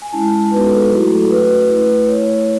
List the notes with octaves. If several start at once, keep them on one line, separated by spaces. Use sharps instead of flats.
G#5
G#3 C#4 E4 A5
G#3 B3 D#4 F#4 B4
A4
G#4
F#3 A3 E4 F#4
A4
A3 C#4 F#4 B4
A3 E4 B4
A3 E4 C#5